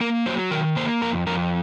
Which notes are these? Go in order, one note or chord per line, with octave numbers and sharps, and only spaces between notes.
A#3 A#4
F#3 C5
D#3 A#4
A#3 C5
F2 A#4
F2 A#4